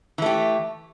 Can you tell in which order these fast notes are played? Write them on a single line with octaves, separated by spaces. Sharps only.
E3 A3 G4